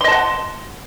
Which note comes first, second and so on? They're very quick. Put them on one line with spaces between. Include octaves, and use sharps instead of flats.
C6 D#5 A5 F#5